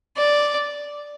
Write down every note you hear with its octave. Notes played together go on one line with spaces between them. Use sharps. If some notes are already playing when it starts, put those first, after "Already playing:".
D5